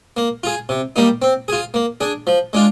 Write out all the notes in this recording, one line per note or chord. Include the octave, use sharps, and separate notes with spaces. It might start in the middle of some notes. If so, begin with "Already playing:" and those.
A#3
F4 G#4
C3
G3 A#3 D#4
C4
F4 G#4
A#3
D4 G#4
F3
G#3 D4 F4